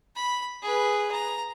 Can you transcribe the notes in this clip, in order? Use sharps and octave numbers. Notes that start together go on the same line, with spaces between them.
B5
G#4 B4
A#5